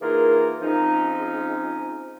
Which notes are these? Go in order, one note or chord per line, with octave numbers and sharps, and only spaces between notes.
E3 A#3 D#4 F4 G#4 A#4
F3 G#3 C4 C#4 D#4